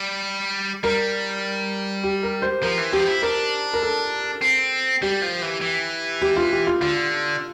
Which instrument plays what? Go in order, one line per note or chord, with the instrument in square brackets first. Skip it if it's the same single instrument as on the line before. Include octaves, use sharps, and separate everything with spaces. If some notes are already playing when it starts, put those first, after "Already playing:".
Already playing: [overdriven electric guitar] G3
[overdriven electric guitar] G3 [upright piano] A#4
[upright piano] G4
A#4
C5
[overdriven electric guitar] F3 [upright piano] A#4
[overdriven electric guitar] E3
[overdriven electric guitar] F3 [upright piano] G4
[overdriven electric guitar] E4
[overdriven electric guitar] D4 [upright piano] A#4
[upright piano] A#4
A4
[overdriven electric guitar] C4
[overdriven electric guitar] G3 [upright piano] G4
[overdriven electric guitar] F3
E3
E3
[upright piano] G4
F4
G4
F4
[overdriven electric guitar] D3 [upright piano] F4